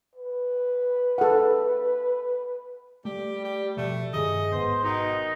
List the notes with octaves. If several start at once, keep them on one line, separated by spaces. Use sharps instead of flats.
B4
A4 F#5
G3 A3 G4
G4
B2 F3 A3
G2 D#3 G#4 D#5
D1 G#1 B3 C5
B2 D#3 D#4